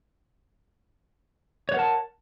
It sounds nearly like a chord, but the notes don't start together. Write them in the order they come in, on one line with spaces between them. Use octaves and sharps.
C#5 B4 F#5 A#4 A5